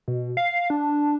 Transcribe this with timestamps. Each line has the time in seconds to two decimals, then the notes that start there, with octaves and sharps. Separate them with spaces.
0.08 B2
0.37 F5
0.70 D4